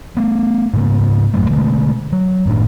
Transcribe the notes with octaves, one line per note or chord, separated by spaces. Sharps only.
A3 B3
G#2 C#3 A#3
A1 F#2 F#3 A3
B2 D3 G#3 A3
F#3
F#1 A2 D#3 D4